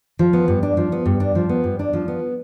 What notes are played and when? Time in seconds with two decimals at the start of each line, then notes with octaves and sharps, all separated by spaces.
0.19 F3
0.33 B3
0.48 G2
0.63 D4
0.77 F3
0.92 B3
1.06 G2
1.20 D4
1.35 F3
1.49 B3
1.64 G2
1.79 D4
1.93 F3
2.08 B3